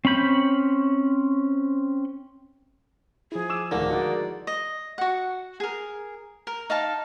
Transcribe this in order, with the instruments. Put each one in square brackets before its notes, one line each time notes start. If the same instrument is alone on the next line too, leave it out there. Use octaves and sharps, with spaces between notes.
[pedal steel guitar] C4 C#4 B5 G6
[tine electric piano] F3 E4 [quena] G#4
[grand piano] D6 E6 E7
[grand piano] D1 D#3 [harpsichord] D3 A#3
[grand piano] G#3 D#4 F#4 [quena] D5
[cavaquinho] D#5
F#4 F#5
G#4 A#4
A#4
D#4 F5 A5